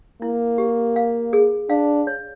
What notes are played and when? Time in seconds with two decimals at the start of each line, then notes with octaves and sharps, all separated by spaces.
0.22 A#3 E4
0.58 G4
0.96 F5
1.33 G#4
1.70 D4 F5
2.07 C#5